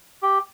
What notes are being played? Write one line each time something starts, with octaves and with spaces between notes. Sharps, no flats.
G4